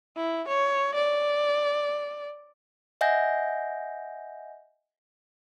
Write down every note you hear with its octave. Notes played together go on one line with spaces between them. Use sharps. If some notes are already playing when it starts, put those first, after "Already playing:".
E4
C#5
D5
D#5 E5 F#5 G#5 G6 A#6